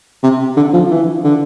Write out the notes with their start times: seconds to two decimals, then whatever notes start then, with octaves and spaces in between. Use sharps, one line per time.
0.23 C3
0.57 D3
0.73 F3
0.91 E3
1.24 D3